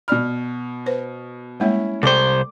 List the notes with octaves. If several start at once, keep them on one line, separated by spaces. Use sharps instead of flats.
B2 D5 B5 F6
B4 C5
G3 G#3 A#3 C#4 E4
C2 A4 C5 D5 G5 D6